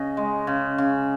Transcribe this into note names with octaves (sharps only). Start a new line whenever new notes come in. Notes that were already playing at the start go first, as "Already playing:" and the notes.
Already playing: C#3 D#5
G#3
C#3
C#3